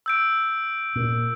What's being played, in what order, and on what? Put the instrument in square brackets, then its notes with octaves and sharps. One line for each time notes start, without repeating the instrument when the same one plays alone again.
[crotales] E6 G6 D7
[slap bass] A#2